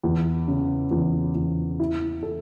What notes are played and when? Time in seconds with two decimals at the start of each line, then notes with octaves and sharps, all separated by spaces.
0.03 E2
0.48 C#3
0.91 E2
1.35 E2
1.80 E4
2.23 A4